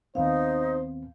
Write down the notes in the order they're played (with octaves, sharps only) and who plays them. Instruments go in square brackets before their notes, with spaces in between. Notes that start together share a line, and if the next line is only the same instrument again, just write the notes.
[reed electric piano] D#2 B3 C4 [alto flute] D#4 [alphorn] C5 [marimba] F5